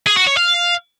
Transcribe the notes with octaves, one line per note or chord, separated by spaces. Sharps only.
G#4
F#4
C#5
F5